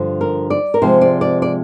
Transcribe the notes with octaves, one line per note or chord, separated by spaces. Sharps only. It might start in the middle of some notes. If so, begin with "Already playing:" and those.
Already playing: G2 D3 F3
A#4
D5
A#4
C3 F3 G#3 C5
D5
D5
D5